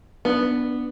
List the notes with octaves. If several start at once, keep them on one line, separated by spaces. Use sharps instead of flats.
B3 D4